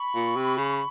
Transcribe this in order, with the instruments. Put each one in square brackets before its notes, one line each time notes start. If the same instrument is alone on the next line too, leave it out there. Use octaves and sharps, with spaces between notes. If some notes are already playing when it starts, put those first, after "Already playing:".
Already playing: [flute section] B5 C#6
[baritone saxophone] A#2
C3
C#3